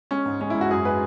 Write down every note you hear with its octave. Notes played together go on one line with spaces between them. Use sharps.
G#3 C#4
G#2
G#3 C#4
E4
G#2
F#4
F#2 G#4
G#3 B4